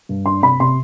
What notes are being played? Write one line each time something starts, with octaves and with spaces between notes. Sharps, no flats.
G2
D4 C6
C3 B5
C3 C6